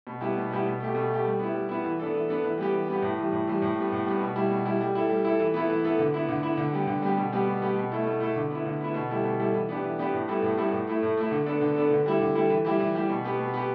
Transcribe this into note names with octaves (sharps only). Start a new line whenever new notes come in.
B2
G3 B3 E4 G4
B2
G3 B3 E4 G4
B2
A3 G4
B2
A3 G4
G3
B3 E4
G3
B3 E4
E3
B3 D4 A4
E3
B3 D4 A4
E3
G3 B3 G4
E3
G3 B3 G4
A2
E3 G3
A2
E3 G3
A2
G3 B3
A2
G3 B3
B2
G3 E4
B2
G3 E4
G3
E4 A4
G3
E4 A4
E3
B3 E4 A4
E3
B3 E4 A4
D3
B3 E4
D3
B3 E4
D3
G3 B3 G4
D3
G3 B3 G4
B2
G3 B3 G4
B2
G3 B3 G4
B2
A3 E4 A4
B2
A3 E4 A4
D3
B3 E4
D3
B3 E4
B2
G3 E4 A4
B2
G3 E4 A4
E3
B3 D4 G4
E3
B3 D4 G4
A2
G3 B3 E4 A4
A2
G3 B3 E4 A4
A2
A3 E4
A2
A3 E4
D3
B3 D4 A4
D3
B3 D4 A4
D3
G3 E4 A4
D3
G3 E4 A4
E3
G3 E4 G4
E3
G3 E4 G4
B2
B3 G4
B2
B3 G4